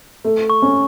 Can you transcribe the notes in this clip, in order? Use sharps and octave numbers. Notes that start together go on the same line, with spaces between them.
A3
C#6
C#4